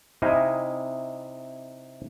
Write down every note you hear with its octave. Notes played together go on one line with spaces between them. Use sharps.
C3 D#4 E4 D#5 F5 G#5